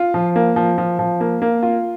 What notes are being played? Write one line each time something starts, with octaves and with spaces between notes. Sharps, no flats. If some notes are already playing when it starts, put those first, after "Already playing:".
Already playing: F4
F3
A#3
F3
F3
F3
A#3
A#3
F4